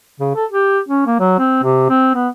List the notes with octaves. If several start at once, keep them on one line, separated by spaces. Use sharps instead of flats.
C#3
A4
G4
C#4
A#3
F#3
C4
C3
C4
B3